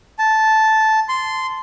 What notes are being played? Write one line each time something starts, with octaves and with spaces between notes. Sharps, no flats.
A5
C6